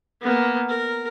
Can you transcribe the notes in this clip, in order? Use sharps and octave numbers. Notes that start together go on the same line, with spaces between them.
A#3 B3
A#4